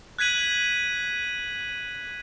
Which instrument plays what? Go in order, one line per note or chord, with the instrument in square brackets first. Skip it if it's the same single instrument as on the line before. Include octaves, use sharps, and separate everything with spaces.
[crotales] F#6 G#6 B6 D#7 F#7